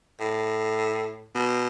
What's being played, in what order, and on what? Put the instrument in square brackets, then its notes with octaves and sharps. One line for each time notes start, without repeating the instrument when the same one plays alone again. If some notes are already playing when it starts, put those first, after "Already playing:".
[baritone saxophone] A2
B2